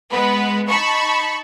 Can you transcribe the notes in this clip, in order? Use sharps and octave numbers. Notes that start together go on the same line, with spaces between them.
G#3 B3 B4
D#4 A5 B5 C#6